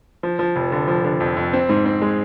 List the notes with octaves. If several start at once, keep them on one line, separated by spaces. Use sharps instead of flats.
F3
F3
F1
D3
F3
D3
F2
F2
C4
G#2
C4
G#3